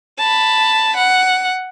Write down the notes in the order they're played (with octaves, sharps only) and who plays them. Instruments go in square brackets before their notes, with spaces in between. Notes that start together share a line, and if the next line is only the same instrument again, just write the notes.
[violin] A5 B5
F#5